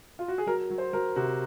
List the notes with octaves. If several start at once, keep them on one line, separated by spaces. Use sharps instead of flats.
F4
F#4
G#4
F#3 A#4
F#3
C5
F#3 A#4
C3 F#4